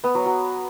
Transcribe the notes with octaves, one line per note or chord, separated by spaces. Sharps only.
B3
F#3
F#3